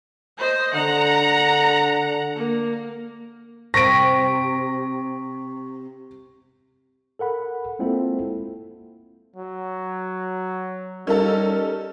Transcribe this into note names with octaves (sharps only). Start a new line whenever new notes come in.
C5 D#5
D3 F#5 A#5
A#3
C3 C4 C#6 A#6 B6 D7
A4 A#4 F#5 B5
G#3 A#3 C4 E4 F4 A4
F#3
G3 C#4 D#4 A4 A#4